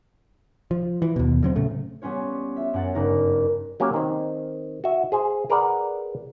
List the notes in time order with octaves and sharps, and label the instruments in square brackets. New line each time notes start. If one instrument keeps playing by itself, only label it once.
[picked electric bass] F3
E3
D#2 B2
D3 F#3 C4
A2 C#3 A3
[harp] G3 B3 C#4 F4 C#5
F4 E5
F#2 F#5 A6
F#1 G2 D#4 A#4
[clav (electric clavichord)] F#3 A#3 C#4 G4
D#3 C4
F#4 E5
G#4 C5 G#5
G#4 A#4 B4 D5 F#5